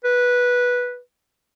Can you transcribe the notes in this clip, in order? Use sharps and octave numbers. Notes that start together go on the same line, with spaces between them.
B4